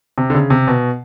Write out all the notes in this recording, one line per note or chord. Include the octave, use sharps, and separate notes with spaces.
C3
D3
C#3
C3
B2